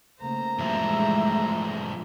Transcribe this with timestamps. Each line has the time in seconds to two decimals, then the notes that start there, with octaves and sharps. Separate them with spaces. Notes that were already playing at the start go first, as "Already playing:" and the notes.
0.21 C#3 A3 A#3 C5 A#5
0.59 G2 E3 F3 G#3 A3 E5